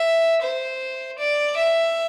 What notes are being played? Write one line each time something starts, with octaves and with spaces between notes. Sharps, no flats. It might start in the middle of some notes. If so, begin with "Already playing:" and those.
Already playing: E5
C5
D5
E5